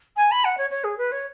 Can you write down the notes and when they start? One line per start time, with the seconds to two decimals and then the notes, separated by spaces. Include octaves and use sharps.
0.16 G#5
0.31 B5
0.44 F#5
0.57 C#5
0.70 C#5
0.83 G#4
0.97 B4
1.11 C#5